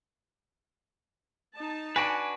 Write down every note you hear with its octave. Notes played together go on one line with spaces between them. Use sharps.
D#4 A5
D4 F#4 B4 G#5 D7